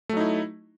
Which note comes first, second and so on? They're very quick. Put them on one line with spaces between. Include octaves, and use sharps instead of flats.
A3 F#3 D#4 E4